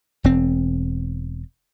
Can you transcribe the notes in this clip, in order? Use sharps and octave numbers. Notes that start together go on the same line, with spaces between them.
E1 C4